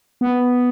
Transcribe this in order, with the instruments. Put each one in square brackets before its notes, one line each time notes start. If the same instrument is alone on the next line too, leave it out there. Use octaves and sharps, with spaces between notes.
[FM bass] B3